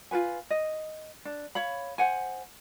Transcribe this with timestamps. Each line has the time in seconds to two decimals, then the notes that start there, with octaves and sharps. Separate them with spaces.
0.11 F4 F#4 B4 G#5
0.50 D#5
1.25 D4
1.55 C#5 F5 B5
1.98 C5 F#5 G#5